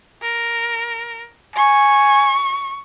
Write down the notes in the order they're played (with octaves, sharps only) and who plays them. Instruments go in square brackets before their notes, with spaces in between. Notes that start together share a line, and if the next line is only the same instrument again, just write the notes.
[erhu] A#4
[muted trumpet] G#5 [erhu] C#6